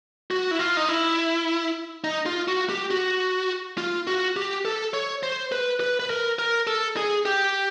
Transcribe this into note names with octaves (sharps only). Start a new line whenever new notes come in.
F#4
E4
F4
D#4
E4
D#4
F4
F#4
G4
F#4
F4
F#4
G4
A4
C#5
C5
B4
B4
B4
A#4
A#4
A4
G#4
G4